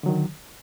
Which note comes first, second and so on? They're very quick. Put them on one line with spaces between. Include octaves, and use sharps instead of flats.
D3 F#3 D#3